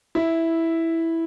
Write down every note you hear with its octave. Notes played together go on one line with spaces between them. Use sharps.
E4